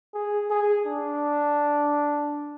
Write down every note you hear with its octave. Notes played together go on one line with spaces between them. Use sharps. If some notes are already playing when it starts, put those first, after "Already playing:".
G#4
G#4
D4